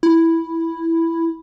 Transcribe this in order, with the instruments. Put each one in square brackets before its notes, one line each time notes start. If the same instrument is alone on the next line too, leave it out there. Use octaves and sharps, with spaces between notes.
[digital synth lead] E4